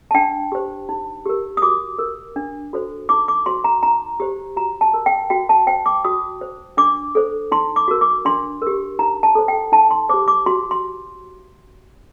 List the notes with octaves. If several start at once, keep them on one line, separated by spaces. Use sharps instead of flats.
A5
D4 G5
G4 C5
D#4
G4 A#4
D#6
F#4 D6
A#4
D4
F#4 A4 C5
D#4 D6
D6
F#4 C5 C6
A#5
D#4 A#5
G4 C5
F#4 A#5
A5
A#4
G5
F#4 G5
A5
C5 G5
D6
F#4 D#6
C5
D4 D6
A4 C5
D#4 C6
D6
F#4 A#4
D6
D4 C6
G4 A#4
D#4 A#5
A5
A4 C5
G5
D#4 A5
C6
G4 C5 D6
D6
F#4 C6
C6